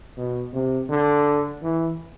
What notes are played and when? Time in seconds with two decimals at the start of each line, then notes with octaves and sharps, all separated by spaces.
0.17 B2
0.53 C3
0.90 D3
1.62 E3